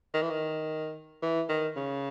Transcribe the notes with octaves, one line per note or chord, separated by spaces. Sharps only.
D#3
E3
D#3
E3
D#3
C#3